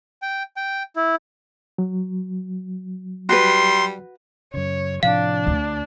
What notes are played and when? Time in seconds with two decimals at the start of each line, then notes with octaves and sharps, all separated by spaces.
0.22 G5
0.56 G5
0.96 E4
1.78 F#3
3.29 G3 F#4 B4 C6
4.54 F#2 C#3 C#5
5.03 A2 C3 F3 D4 F5
5.46 D2